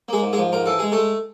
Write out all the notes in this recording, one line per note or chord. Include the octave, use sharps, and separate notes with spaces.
G#3 A#3 G#4
G#2
G#3 G#4
F3
G#2 A#4
E3 A4
G#3 G#4
G#3 A3 A4